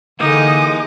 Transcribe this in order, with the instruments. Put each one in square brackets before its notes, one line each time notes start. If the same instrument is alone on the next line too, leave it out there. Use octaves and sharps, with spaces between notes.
[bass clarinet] D3 [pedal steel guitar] E3 A#3 G4 [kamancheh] G#3 D#6 [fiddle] D#4